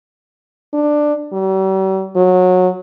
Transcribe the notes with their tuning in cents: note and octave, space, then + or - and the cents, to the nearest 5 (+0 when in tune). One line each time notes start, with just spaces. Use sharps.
D4 +10
G3 -45
F#3 -20